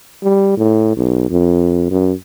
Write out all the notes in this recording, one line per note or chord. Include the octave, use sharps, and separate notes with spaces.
G3
A2
B1
F2
F#2